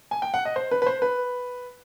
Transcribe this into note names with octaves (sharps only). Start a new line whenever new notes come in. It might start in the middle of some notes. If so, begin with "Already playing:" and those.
G#5
G5
F#5
D#5
C5
B4
B4
C5
B4